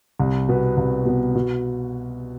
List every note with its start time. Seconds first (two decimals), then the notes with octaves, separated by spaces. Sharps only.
0.20 C2
0.49 B2 B3
0.77 C2
1.06 B2 B3
1.35 B2